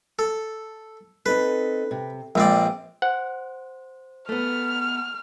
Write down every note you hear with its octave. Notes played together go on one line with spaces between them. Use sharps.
A4
C4 D#4 A4 B4
C3
A#1 G#3 C4 B4 D5 D#5
C5 F#5
A3 B3 F6